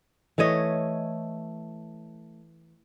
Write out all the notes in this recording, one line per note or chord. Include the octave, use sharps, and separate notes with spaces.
E3 A3 C#5 D#5